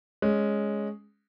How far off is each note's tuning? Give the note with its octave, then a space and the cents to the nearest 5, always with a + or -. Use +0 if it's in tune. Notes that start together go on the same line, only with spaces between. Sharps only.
G#3 +0 C#4 +0